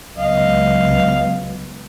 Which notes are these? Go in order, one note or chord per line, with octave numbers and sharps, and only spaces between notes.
C#2 F#3 B3 D#5 F5